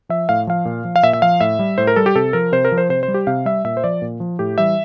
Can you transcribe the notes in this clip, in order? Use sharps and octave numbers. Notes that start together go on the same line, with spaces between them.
F3 E5
A2 F5
F3 F5
A#2
F3
F5
A#2 E5
E5
F3 F5
A2 E5
G3
A2 C5
A#4
G3 A4
G4
C3 A4
F3 A#4
C3 C5
A#4
F3
C5
C3 C5
C5
G3
G4
C3 F5
G3 E5
A#2 E5
C5
F3 D5
A#2
F3
A2 G4
E3 G3 E5